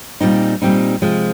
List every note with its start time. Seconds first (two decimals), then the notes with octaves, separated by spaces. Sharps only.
0.21 A#2 G3 C4 D#4
0.62 A#2 G3 C4 D#4
1.02 C3 F3 G#3